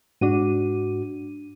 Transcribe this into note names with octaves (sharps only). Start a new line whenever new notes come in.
G#2 D4 F#4 D#7